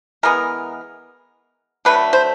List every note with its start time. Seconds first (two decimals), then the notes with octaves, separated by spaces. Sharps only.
0.23 E3 G#3 B3 A#4
1.85 D3 F#3 A3 B4
2.13 C5